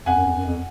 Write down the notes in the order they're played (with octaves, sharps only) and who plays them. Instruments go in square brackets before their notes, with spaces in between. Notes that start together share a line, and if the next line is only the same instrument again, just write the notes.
[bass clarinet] F2 [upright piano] F#5 G#5
[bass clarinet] F#2
F2
F#2
F2